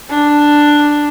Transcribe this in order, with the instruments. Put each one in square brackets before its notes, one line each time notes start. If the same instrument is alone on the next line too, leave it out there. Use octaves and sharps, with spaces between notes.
[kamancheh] D4